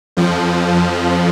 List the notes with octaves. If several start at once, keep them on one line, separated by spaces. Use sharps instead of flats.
F2 F3